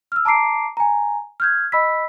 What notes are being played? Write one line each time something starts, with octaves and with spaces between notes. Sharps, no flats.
E6 F6
A5 A#5 D6 C7 D7
G#5 A#5
F6 G6 G#6
D#5 B5 E6 B6